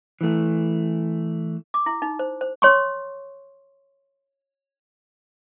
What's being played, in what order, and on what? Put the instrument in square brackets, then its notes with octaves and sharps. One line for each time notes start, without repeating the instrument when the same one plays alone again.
[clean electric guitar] E3 A3
[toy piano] D6
E4
D#4
C5
C5
C#5 C6 C#6